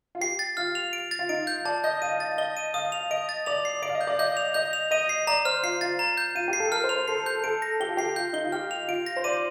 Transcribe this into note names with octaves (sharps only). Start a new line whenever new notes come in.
F4
G4 C7
A6
F4 F6
F7
D7
A6
F4
D#4 D7
G6
D5 A5
D#5 G6
F5 D#7
A6
D#5 G7
D#7
F5 D#6
F7
D#5 D7
A6
D5 F7
C7
D5 D7
F5
D#5
G6
D5
D#5 G6
F7
D#5 G6
F7
D#5 D#7
C7
D5 A#5
C5 F6
F4 C7
F4 A6
A#5
G6
F4 D#7
G4
C7
A4
A#4 F6
C5
F7
C5
A4 C7
G6
A4 D7
A#6
G4 G7
F4
G4 C7
F4 G6
D#4 G7
F4
G4 F6
F7
F4 D7
A#6
C5
D5 D#7